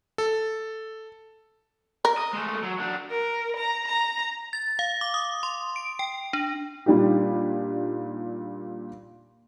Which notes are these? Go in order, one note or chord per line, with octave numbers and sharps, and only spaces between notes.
A4
A#4
D#5
G#3 A3
F#3
F#3 D4
A#4
A#5
A#5
A6
F5
D6
D#6
C6
D7
G5
D4
A#2 G3 D4 D#4 G4